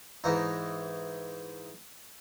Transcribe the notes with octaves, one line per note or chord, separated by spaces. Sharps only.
G#2 E3 D#4